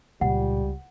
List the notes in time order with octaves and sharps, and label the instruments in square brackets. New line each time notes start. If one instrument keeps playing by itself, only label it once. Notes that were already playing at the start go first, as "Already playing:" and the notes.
[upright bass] C#2 [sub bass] A#2 [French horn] G3 [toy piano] F#5